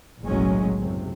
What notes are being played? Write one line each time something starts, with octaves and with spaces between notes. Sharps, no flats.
F#1 B1 A2 F#3 G#3 C#4
F#1 C3